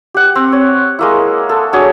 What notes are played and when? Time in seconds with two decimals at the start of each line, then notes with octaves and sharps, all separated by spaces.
0.14 G4 F#5
0.35 C4
0.52 C#5
0.99 G#3 A#3 E4
1.49 A4
1.73 F#3 D4 G#4 C#5